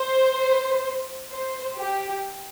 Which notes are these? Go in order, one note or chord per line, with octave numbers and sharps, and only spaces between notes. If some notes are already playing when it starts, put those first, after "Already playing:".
Already playing: C5
C5
G4